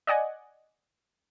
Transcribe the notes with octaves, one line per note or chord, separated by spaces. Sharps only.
D5 D#5 F#5 G#5